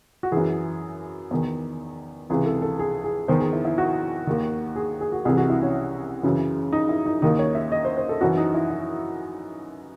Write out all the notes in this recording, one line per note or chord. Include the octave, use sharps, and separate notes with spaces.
F#4
F#2 E3 G#4
E2 D#3
C#2 C3 E3 G#4
A4
A4
G#4
G#4
E2 D#3 C5
G#4
E4
E4
F#4
D#2 D#3
G#4
G#4
F#4
C2 C3 E3 G#4
F#4
E4
C#4
F#2 C#3 E3
D#4
E4
D#4
D#2 D#3 D#4
C#5
E5
D#5
C5
C5
A4
F#2 E3 F#4
D#4
E4
E4